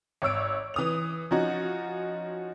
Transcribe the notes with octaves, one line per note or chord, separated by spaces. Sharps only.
G#1 C#5 E6 D7
E3 D#6 F7
F3 C#4 D#4 F#4